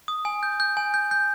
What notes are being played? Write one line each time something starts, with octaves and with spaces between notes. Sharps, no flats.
D#6
G#5
G6
G6
G#5
G6
G6